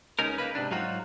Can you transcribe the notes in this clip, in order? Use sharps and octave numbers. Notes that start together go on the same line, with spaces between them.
C#2 C#4 D#4 A#4
A#3 D#4 B4
G#2 C3 D4
G#2 F#3 D#4 F4 F#4